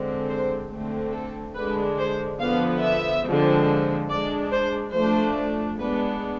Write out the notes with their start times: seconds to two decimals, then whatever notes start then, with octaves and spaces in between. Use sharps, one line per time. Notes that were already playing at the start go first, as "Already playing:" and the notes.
Already playing: D3 G#3 C4
0.29 C5
0.71 D3 A3 C4
1.13 A4
1.55 D3 G#3 D4 B4
1.98 C5
2.39 D3 F3 B3 F5
2.83 E5
3.24 D3 F3 G#3 C4
4.10 G#3 D4 D5
4.51 C5
4.94 F3 A3 D4 C5
5.78 G#3 B3 D4 B4